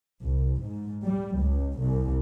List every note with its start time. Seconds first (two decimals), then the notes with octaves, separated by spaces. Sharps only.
0.23 C2
0.62 G#2
1.03 G3
1.40 C#2
1.79 C2